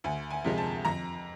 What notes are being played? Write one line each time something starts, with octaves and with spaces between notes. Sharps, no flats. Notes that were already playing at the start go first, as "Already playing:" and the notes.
D2 G#5
G#5
C3 F3 G#3
A5
F2 A#5